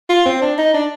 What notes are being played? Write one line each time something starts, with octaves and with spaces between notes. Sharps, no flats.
F4
C4
D4
D#4
D4